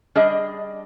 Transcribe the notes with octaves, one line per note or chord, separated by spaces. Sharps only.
G3 D4 G#4 D#5